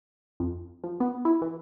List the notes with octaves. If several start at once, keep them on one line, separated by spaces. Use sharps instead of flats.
F2
F3
B3
E4
E3